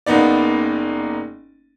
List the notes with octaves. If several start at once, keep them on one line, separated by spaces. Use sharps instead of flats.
F#1 A#3 B3 D#4 D5